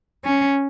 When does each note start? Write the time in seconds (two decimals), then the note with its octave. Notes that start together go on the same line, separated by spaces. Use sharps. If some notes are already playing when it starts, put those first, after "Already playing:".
0.25 C#4